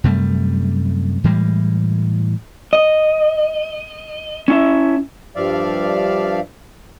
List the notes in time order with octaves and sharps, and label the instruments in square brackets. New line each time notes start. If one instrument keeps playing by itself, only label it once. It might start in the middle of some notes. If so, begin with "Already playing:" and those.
[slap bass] F#2 C3 G3 A3
A2 E3 G3 G#3
[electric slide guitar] D#5
C#4 E4 E5
[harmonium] G2 F3 D5 E5 F5